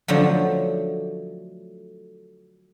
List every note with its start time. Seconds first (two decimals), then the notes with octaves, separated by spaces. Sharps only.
0.08 D3 F3 F#3 A3